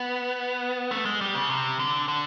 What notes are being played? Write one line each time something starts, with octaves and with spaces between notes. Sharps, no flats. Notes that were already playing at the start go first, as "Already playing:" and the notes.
Already playing: B3
A3
G#3
G3
C#3
C3
D3
D3